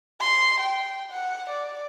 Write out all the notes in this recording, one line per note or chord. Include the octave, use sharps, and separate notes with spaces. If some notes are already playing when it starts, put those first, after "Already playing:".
C6
G5
F#5
D5